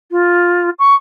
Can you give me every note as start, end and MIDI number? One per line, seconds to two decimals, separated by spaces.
0.11 0.69 65
0.79 0.94 85